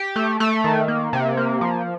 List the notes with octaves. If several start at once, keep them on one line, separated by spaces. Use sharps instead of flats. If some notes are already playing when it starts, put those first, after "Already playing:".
Already playing: G4
A3
A3
D#3
A#3
C3
A#3
F3